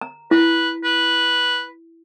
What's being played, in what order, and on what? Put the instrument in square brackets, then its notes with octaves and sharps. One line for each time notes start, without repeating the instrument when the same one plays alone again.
[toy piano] A#5
[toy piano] E4 [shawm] B4
[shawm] B4